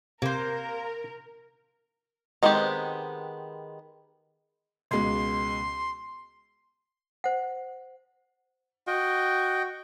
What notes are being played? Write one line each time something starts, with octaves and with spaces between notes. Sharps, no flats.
C3 A#3 A#4 C5
D#3 G#3 B3 C4 G4
C#2 B2 G#3 C6
C5 F#5
F#4 D#5 G5